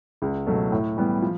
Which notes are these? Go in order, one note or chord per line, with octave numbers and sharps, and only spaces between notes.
C#2
B2 F#3 A3
A2
E3 G3 B3
F3